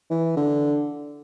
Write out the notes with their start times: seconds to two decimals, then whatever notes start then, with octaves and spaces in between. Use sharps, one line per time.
0.11 E3
0.37 D3